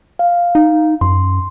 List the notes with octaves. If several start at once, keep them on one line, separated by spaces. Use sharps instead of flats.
F5
D#4
F#2 C6